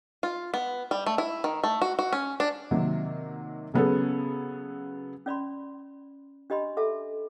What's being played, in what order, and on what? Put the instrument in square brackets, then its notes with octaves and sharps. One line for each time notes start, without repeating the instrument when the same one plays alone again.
[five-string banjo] F4
B3
G3
A3
E4
D#3
A3
F#4
F#4
C#4
D4
[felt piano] C3 D#3 F#3 A#3
C#3 F#3 B3 C#4 G#4 A4
[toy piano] C#4 D5 B5 C6
D4 G4 D#5 B5 C6
A4 E5 A5